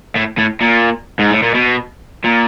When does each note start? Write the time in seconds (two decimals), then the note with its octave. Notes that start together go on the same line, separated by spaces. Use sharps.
0.16 A2
0.38 A2
0.61 A#2
1.19 G#2
1.31 A2
1.43 A#2
1.55 B2
2.24 A#2